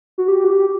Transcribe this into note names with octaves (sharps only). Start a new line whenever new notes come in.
F#4
G4
F#4
G4